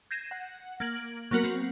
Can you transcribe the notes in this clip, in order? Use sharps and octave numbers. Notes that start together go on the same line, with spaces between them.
G6 G#6 A#6 C7 D#7 E7
F#5
A#3 G#6 D7 F#7
F#3 A#3 B3 F#4 A#4
A#3 C4